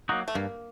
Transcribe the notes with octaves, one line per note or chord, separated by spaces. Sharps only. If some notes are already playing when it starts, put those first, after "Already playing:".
F#3 A#3 D#4 F#4
A3
G2 A#3